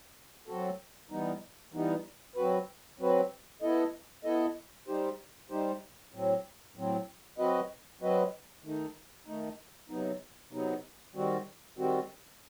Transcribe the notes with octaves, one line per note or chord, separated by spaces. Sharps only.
F#3 C4 F#4 A4
E3 G3 B3 D#4
E3 G3 B3 D#4
F#3 C4 F#4 B4
F#3 C4 F#4 B4
B3 E4 A4 D#5
B3 E4 A4 D#5
G3 D#4 G4 C5
G3 D#4 G4 C5
A2 F#3 C4
A2 F#3 C4
F#3 C4 F#4 B4 D#5
F#3 C4 F#4 B4 D#5
D#3 A3 D#4
D#3 A3 D#4
C3 F#3 B3 D#4
C3 F#3 B3 D#4
D#3 G3 C4 F#4
D#3 G3 C4 F#4